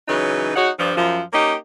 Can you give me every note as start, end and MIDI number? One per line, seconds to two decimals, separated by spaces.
0.08 0.52 49
0.08 0.52 52
0.08 0.52 54
0.08 0.52 63
0.08 0.52 71
0.55 0.70 56
0.55 0.70 63
0.55 0.70 66
0.55 0.70 73
0.55 0.70 78
0.79 0.96 43
0.79 0.96 53
0.96 1.21 42
0.96 1.21 53
1.33 1.55 58
1.33 1.55 61
1.33 1.55 63
1.33 1.55 67